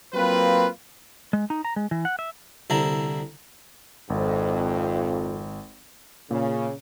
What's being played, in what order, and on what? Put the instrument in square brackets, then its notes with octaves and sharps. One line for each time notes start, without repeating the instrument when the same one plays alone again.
[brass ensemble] F#3 A#3 C4 F4 B4
[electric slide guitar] G#3
D#4
A#5
G#3
E3
F#5
E5
[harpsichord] C2 D3 E4 A#5
[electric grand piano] G#1 [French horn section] F2
[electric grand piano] A#2 [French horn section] C#3